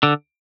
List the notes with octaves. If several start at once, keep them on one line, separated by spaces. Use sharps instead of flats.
D3